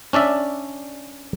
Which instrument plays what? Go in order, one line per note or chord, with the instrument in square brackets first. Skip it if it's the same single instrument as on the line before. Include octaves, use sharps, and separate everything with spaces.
[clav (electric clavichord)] C#4 D4 D5 E5